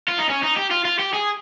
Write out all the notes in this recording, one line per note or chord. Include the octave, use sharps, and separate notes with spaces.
F4
D#4
C#4
D#4
G4
F4
F4
G4
G#4